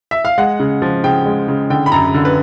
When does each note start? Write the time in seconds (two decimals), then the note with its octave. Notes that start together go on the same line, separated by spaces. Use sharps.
0.11 E5
0.25 F5
0.38 G#3 F#5
0.60 C#3
0.82 F3
1.04 C#3 G5
1.26 G#3
1.48 C#3
1.70 D3 G5
1.86 B5
1.92 F#2 A#5
2.14 D3
2.25 B4